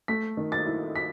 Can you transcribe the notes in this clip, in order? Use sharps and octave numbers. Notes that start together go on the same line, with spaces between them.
A3 B6
D#3
A6
E4
B6